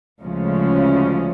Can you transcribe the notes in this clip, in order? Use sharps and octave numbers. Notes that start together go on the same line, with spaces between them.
D2 C#3 F3 G#3 C#4